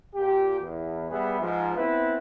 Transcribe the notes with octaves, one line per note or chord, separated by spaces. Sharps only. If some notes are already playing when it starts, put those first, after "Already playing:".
A#2 G4
E2
G3 B3 G#4 B4 E5
G#2 F3
B3 C4 E4 B4